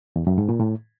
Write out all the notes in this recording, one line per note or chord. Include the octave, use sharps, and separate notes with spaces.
E2
F#2
G#2
A#2
A2